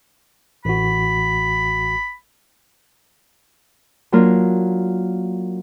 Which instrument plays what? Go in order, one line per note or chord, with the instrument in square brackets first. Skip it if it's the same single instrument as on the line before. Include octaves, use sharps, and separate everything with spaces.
[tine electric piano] A1 F#4 [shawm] B5
[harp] F#3 A#3 D4 F4 A#4